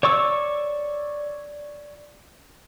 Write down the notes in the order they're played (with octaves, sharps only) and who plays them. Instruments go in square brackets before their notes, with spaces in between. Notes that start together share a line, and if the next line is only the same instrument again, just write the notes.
[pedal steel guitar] C#5 D5 C#6 E6